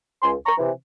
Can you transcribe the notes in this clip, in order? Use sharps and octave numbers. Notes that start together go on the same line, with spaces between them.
C#2 G#5 C6
A#5 C#6
C3 E3